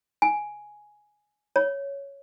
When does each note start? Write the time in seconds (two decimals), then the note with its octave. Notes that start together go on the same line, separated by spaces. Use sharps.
0.22 G#5
1.56 C#5